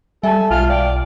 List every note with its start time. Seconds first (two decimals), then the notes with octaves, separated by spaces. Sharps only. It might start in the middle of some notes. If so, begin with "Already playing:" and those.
0.23 G3 A4 E5 G#5 A5
0.51 B1 F4 F6
0.69 D5 G5